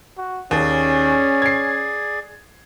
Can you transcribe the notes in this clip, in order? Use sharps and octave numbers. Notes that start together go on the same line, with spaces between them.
F#4
D#2 C#4 G#4 D5
G#6 C7